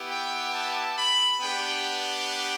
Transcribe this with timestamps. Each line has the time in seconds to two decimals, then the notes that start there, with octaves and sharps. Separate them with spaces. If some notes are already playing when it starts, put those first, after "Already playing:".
Already playing: B3 E4 G4
0.09 G5
0.52 A5
0.96 B5
1.40 B3 D4 G4 G5